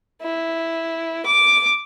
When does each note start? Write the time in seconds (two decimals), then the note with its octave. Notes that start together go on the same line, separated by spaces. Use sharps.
0.22 E4
1.26 D6